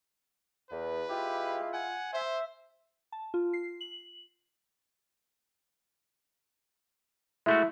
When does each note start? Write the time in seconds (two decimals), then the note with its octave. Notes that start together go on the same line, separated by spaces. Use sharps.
0.70 E2 B4
1.09 G#3 E4 F4 G4
1.74 F#5 G#5
2.13 C5 E5
3.12 A5
3.34 F4
3.53 C7
3.81 F#7
7.46 G#3 A3 E4 F#4